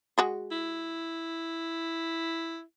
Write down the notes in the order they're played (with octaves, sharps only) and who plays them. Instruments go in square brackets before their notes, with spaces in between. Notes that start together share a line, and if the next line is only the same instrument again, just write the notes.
[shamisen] G#3 F#4 G#4
[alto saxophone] E4